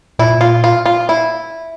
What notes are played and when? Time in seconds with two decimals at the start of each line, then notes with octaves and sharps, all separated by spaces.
0.19 A#2 E4
0.41 F4
0.64 F4
0.86 F4
1.09 E4